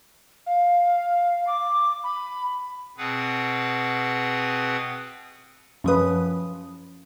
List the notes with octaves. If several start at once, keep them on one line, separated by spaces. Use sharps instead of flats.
F5
D6
B5
B2 C4 G#4 B4 F#5
F#2 F3 C#4 B4 D#6